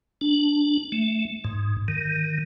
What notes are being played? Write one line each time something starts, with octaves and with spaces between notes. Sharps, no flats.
D4
A3
G#2
D#3